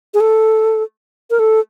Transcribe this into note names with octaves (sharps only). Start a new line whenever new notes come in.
G#4
A4
A#4
A4